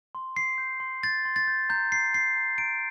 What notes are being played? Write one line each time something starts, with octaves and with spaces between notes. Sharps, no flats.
C6
C6 C7
G6
C6
G6 A6
C6
A6
G6
A#5 G6
A#5 C7
A#5 C7
A#5
A#5 D7